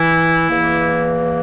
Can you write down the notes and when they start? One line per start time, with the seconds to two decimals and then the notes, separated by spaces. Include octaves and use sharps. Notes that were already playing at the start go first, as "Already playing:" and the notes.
Already playing: E3 E4
0.50 E2 E3 A#3